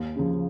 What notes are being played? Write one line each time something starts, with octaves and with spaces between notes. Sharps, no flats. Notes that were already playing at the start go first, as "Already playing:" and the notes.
Already playing: D#2
C#3 F3